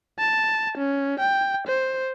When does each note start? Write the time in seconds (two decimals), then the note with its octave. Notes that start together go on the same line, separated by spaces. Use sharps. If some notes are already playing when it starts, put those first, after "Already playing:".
0.19 A5
0.77 C#4
1.19 G5
1.67 C5